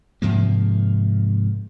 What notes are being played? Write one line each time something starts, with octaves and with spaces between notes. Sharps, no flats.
G#2 C3 F3 A#3